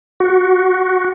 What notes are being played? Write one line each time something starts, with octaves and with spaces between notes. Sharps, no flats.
F#4